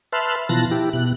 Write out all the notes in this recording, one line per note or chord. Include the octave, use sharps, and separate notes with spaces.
B4 E5 A5 C6 F6 F#6
B2 E3 F3 A5 F#6 A#6
E4 G4
B2 F#6